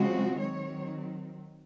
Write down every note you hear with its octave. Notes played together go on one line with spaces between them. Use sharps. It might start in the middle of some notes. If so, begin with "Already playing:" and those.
Already playing: C#3 F3 G#3 C4 F#4
D#3 F#3 C4 C#5